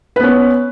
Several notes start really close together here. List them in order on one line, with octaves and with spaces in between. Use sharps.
B4 B3 C#4